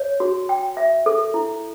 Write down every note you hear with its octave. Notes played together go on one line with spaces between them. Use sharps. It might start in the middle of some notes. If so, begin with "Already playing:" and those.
Already playing: C#5
F#4
G5
E5
A4
E4